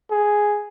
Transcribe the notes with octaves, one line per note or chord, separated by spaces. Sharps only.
G#4